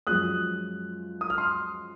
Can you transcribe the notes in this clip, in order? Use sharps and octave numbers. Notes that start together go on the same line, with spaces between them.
F#2 F3 G#3 D#6 F#6
D#6
F6
C6 D#6